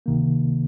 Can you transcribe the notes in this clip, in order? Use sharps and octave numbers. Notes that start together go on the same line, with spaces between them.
C#2 C3 D#3 A#3